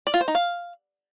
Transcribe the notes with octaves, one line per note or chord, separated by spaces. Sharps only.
D5
F4
C5
D#4
F5